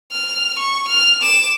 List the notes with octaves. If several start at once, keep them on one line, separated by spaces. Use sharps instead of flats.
F6
C#6
F6
D6 E7